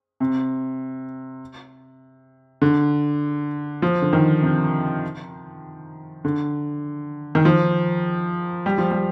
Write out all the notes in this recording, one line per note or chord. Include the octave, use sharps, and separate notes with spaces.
C3
D3
F3
D3
D#3
C3
D3
D#3
F3
G3
F3
G3